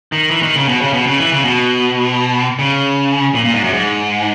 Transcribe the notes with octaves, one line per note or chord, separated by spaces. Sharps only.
D#3
E3
D#3
C#3
B2
C#3
B2
C#3
E3
C#3
B2
C#3
A#2
A#2
G#2
F#2
G#2